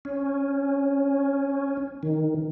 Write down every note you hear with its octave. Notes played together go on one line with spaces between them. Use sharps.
C#4
D#3